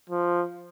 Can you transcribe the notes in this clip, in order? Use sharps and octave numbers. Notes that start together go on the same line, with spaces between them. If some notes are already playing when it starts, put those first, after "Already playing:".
F3